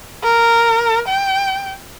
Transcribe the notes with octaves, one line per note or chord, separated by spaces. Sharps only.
A#4
G5